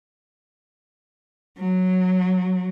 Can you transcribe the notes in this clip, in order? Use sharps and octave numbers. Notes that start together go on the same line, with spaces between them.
F#3